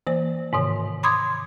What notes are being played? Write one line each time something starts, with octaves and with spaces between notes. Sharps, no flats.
E3 A#3 C5
G#2 C3 D#3
B5 C6 D6 D#6 G#6